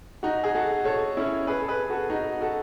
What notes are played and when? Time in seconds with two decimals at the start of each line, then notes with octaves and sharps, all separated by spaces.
0.23 D#4 F#4
0.44 G#4
0.55 F#4 A4
0.85 A4 C#5
1.17 C#4 E4
1.47 G#4 B4
1.61 A4
1.68 G#4 B4
1.90 F#4 A4
2.09 D#4 F#4
2.41 F#4 A4